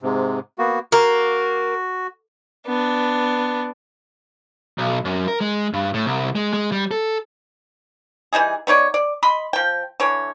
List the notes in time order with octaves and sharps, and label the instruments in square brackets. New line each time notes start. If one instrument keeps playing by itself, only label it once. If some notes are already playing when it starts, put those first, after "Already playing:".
[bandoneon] G#2 C3
A#3 B3 F#4
[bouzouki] A#3 [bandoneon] F#4
[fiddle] B3 D4
[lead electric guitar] B1
F#2
A#4
G#3
G2
A2
C2
G#3
G#3
G3
A4
[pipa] E3 G3 D#4 G#4
B3 D#4 C#5 D5
D5
D#5 B5 C6
F3 G5
D3 E3 C#5